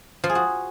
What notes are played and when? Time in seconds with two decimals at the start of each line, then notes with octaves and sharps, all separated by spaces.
0.24 F3
0.29 G#4
0.35 F#4